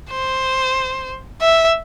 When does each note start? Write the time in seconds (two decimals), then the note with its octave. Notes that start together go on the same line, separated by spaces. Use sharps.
0.11 C5
1.41 E5